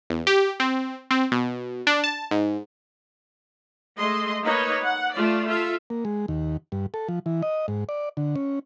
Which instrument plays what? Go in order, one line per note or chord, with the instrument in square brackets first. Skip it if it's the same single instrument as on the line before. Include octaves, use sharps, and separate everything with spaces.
[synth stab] E2
G4
C4
C4
B2
D4
A5
G#2
[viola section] G#3 A3 D#5 C6
A#3 D#4 B4 C#5 D#5
F#5
A3 F4 D5
F4 A4 E5 F5
[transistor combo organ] A#3
G#3
D#2
G2
A4
F3
E3
D#5
G#2
D5
D3
C#4